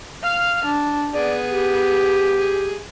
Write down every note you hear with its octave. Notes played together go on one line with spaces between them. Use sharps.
F5 F6
D4
B3 G#4 D5
G4
G#4